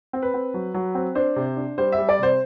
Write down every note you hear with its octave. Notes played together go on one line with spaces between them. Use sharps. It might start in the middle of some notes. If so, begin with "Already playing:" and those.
C4
B4
C4
F#3
F#3
C4
D4 C5
C3
D4
G3 C5
E5
G3
D5
C3 C5